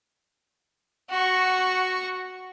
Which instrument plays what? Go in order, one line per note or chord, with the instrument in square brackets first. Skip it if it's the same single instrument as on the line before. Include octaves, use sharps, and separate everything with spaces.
[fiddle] F#4 C#6